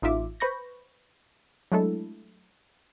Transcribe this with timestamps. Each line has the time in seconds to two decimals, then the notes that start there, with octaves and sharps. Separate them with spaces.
0.02 A1 D#4 F4 E5 D6
0.40 B4 C5 B5 C#6 G6 A#6
1.72 F#3 G#3 A3 D4 E4 A4